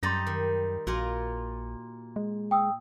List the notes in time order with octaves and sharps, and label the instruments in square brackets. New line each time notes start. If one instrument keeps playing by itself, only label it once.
[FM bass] F#2 [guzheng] G3 D#4 G4 [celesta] C6 A6 A#6
[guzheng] D#3
[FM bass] A#1 [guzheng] A#2 F4 A#4 [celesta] F#4
[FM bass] G#3
[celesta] G5 D#6 E6